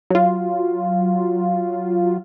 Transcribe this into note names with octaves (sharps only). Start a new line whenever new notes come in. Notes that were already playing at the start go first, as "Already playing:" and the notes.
F#3 F4